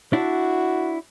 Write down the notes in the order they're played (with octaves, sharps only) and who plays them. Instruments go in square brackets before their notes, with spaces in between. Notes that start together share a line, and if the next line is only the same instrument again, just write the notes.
[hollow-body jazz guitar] D4 E4 [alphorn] F#4